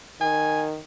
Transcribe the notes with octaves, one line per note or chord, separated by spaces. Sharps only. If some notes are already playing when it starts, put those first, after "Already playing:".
D#3 G#5